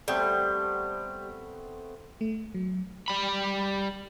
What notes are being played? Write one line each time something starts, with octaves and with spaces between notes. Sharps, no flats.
G3 A3 B3 C4
A3
F#3
G3 B5